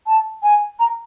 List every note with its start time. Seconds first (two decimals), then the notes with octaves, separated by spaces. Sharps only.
0.06 A5
0.43 G#5
0.79 A#5